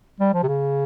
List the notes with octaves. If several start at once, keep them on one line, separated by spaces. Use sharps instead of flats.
G3
F3
C3
C#3